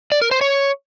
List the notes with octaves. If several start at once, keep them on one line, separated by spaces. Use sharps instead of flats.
D5
A#4
C5
C#5